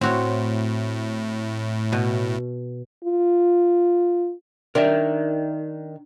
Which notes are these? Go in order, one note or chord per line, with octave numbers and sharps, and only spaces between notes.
A2 C4 F#4 C#5
B2
F4
D#3 D4 A#4 D5 E5